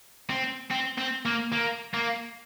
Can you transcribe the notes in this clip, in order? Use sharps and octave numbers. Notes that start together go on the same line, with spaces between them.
C4
C4
C4
A#3
A#3
A#3